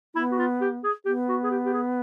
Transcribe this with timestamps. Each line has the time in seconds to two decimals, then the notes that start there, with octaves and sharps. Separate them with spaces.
0.15 B3 E4
0.31 F#4
0.39 F4
0.61 G4
0.84 G#4
1.05 B3 G4
1.29 F#4
1.44 G#4
1.51 G4
1.65 G4
1.73 G#4